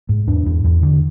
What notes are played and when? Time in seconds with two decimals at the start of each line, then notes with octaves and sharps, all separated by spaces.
0.09 G#2
0.27 E2 D4
0.46 E2
0.64 E2
0.82 D3